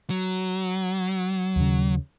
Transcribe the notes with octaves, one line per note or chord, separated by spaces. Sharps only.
F#3
D#2 C#3